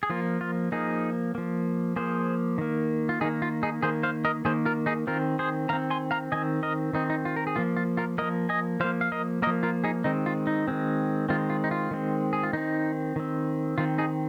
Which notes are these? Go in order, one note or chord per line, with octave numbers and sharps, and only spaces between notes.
G#4
F3 A#3 F4
F4
F3 A#3 D#4 G#4
F3 A#3
F3 A#3 G#4 C5
D#3 A#3
F4
D#3 A#3 D#4 G#4
F4
D#4 G#4
D#3 A#3 G#4 C5
C5 F5
A#4 D#5
D#3 A#3 G#4 C5
F4 A#4
D#4 G#4
D#3 C4 F4 A#4
G#4 C5
D#3 C4 F5 A#5
G#5 C6
F5 A#5
D#3 C4 D#5 G#5
A#4 D#5
D#3 C4 D#4
D#4
F4
A#4
G#4
F3 A#3 F4
F4
F4 A#4
F3 A#3 A#4 D#5
D#5 G#5
F3 A#3 C5 F5
F5
A#4 D#5
F3 A#3 A#4 D#5
F4 A#4
D#4 G#4
D#3 G#3 C4 D#4
F4
D#4
D#3 G#3 C4
D#3 G#3 C4 F4
F4
D#4
F4
D#3 G#3 C4
G#4
F4
D#3 C4 D#4
D#3 C4
D#3 C4 F4
D#4 G#4